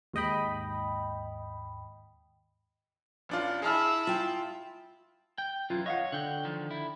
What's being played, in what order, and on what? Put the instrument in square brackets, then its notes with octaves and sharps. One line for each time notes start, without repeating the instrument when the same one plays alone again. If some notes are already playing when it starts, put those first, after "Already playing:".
[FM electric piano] D#2 G#2 D#5 G5 B5
[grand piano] A1 D4 F4
[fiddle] E4 [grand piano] G#4 A5 F6
[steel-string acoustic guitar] F4 G5
[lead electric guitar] G5
[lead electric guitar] F#2 E3 [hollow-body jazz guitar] F4
[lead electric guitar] C#5 [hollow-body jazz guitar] D#5 F5 F#5
[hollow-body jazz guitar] D3 [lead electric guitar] F#5 G5
[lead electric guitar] D#3 F3
E4